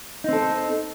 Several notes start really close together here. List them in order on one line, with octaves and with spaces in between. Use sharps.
D#4 C4 A4